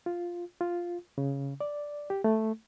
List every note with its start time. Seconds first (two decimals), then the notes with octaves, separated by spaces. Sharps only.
0.06 F4
0.61 F4
1.18 C#3
1.61 D5
2.10 G4
2.24 A3